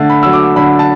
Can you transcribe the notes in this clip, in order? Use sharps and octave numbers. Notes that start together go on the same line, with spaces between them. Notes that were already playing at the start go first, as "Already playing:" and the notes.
Already playing: D3 A3 A5
B5
F#3 E6
D6
D3 B5
A5